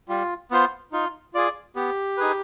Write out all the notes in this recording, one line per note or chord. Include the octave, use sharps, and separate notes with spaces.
G3 F4
B3 F4 C5
D#4 F4
F4 G#4 D5
B3 G4
D#4 G#4 B4